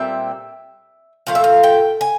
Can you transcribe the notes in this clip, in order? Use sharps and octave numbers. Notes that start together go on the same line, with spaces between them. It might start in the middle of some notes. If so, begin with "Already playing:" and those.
Already playing: A#2 G3 C4 E5
A#2 F3 A3 F5
E5
F5
G5
G#5